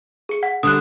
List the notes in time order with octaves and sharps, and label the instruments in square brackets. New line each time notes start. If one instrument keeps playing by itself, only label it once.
[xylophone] G#4 C#7
F#5
[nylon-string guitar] D3 G3 [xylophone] D#6 F#6